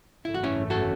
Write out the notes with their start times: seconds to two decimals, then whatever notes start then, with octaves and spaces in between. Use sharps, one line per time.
0.25 G#1 F#2 C#3 E3 A3 E4
0.34 F#4
0.44 C#4 E4
0.70 F#4 A4